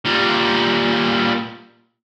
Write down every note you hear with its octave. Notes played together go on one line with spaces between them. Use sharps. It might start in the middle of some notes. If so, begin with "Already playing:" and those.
A#2 G3